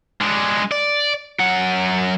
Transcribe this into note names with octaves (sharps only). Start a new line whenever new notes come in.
G#3 D4
D5
F#2 F#5